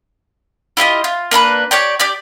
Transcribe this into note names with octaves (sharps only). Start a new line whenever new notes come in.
E4 F4 G4 D#5
F4
A#3 D4 A4 B4
G4 C#5 D5 G5
G4 D5 G6